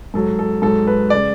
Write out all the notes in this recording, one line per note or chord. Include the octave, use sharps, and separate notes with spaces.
G#2 F#3 A4
A4
G#2 F#3 A4
B4
C#3 G#3 D5